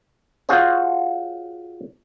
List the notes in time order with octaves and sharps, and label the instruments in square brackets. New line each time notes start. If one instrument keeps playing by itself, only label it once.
[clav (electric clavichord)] F4 F#4 G#4 C5 C#5